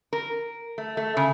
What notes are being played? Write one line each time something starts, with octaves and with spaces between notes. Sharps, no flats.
A#4
A3
A3
C#3